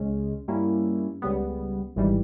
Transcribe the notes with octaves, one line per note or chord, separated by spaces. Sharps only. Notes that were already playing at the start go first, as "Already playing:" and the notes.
Already playing: C#2 C#3 G#3 C#4
G2 G3 A#3 C#4 E4
C#2 C#3 G3 B3
G#1 G#2 E3 G3